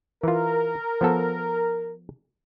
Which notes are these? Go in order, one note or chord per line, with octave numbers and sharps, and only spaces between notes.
E3 F4 A#4
F3 B3 A4